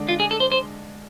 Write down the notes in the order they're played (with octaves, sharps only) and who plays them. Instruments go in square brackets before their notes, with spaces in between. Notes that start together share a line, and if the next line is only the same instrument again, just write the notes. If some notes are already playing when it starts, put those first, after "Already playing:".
Already playing: [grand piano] D3 G#3 D4
[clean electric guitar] F4
G#4
A4
C5
C5